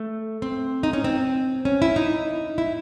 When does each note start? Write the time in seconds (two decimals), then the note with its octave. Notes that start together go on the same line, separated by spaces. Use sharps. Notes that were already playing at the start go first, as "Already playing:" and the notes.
Already playing: A3
0.42 C4
0.83 D#4
0.93 C#4
1.04 C4
1.65 C#4
1.82 E4
1.96 D#4
2.58 E4